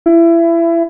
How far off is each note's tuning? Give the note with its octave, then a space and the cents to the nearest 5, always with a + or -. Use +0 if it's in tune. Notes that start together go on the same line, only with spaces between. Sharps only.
E4 +25